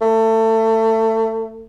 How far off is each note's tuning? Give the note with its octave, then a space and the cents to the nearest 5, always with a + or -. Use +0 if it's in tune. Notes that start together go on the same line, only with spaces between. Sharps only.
A3 +25